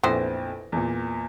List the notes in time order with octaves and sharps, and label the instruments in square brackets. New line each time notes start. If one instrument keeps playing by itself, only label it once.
[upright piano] A#1 F2 A#6 [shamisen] E3 B3 C5
[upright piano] E2 A#2